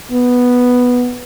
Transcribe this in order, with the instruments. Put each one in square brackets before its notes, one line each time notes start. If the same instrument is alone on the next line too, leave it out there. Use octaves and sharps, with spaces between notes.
[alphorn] B3